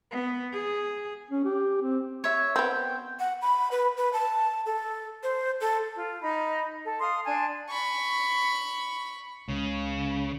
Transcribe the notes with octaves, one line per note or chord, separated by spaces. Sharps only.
B3
G#4
C#4
G4
C4
C#5 E5
B3 C4 G5
F#5
B5
B4
B4
A5
A4
C5
A4
F4
D#4 B5
A4
F5 C6 D#6
D4 G#5 A5
B5 C#6
C#2 C#3